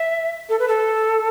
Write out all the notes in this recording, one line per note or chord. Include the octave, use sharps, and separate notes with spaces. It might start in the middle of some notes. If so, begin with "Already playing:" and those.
Already playing: E5
A4
B4
A4